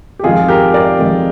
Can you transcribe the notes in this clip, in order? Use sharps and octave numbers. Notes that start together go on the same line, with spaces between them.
G4
F2 D#3 G#3 F4 G#4
G4 A#4
A#4 D5
F2 D#3 G#3